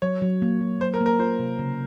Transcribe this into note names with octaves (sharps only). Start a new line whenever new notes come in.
F#3 C#5
F#3
A#3
F#3
F#3 C5
A#4
A#3
A#4
F4 C5
C3
C#3